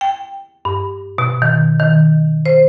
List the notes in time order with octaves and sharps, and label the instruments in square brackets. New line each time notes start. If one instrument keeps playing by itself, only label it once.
[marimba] G5
G2
B2
D#3
D#3
C5